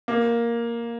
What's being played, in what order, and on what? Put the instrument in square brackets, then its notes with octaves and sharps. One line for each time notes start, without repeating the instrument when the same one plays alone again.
[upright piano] A#3